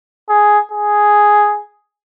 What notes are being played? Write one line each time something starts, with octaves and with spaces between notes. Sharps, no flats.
G#4
G#4